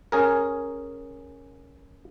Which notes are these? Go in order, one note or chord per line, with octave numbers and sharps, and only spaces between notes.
C#4 G#4 A#4